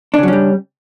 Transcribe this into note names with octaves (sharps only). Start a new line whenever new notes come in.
C#3 F#3 G3 C#4 D4